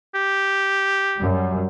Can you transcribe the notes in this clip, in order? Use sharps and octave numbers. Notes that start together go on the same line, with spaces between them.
G4
F#2 G3